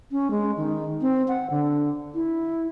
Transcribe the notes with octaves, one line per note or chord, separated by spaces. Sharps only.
C#4
G#3
D#3
C4
F#5
D3
E4